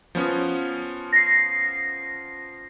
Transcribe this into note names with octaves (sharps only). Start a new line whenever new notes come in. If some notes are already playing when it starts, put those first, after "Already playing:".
F3 B3 C#4
A#6 C7